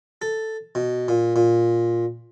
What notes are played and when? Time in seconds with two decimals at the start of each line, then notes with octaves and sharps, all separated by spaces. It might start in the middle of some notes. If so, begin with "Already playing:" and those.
0.22 A4
0.75 B2
1.08 A#2
1.36 A#2